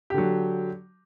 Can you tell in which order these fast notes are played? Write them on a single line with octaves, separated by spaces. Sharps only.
G4 D3 F#3